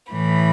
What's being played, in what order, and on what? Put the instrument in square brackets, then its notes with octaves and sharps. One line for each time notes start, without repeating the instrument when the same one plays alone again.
[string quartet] A2 E3 B5